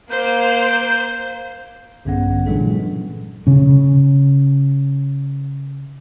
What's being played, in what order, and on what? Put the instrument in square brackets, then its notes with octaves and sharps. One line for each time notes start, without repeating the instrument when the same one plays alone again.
[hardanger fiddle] A#3 [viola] C5 [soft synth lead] G6
[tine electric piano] A#1 G2 D3 B3 C#4 F#5
A#2 E3 F#3 G#3 D4 A4
[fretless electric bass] C#3 C#4